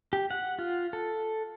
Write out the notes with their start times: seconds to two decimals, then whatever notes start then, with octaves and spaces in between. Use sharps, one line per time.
0.13 G4
0.31 F#5
0.59 F4
0.93 A4